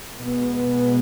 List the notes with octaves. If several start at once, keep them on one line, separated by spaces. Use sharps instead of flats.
B2 G#3 B3